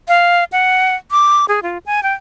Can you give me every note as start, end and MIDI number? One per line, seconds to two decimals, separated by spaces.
0.08 0.44 77
0.52 0.95 78
1.11 1.45 86
1.49 1.60 68
1.63 1.78 65
1.86 2.03 80
2.03 2.13 79